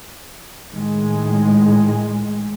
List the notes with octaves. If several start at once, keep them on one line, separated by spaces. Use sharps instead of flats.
A2 D#3 G#3